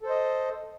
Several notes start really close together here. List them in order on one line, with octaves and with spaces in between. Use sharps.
A4 C5 D#5